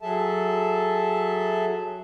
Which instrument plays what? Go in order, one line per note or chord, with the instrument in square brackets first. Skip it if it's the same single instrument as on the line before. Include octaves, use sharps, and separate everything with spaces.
[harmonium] F#3 G#4 A4 E5 A5